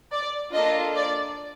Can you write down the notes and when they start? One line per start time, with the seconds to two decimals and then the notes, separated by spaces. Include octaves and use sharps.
0.12 D5
0.54 A#3 D4 F4 A4 D#5
0.95 D5